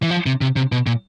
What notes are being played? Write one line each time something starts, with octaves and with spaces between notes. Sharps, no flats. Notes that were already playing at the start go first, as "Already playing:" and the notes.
E3
F3
C3
C3
C3
B2
A#2